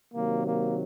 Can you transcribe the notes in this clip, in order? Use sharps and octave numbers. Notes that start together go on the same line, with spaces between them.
C3 D#3 F#3 A#3
A#3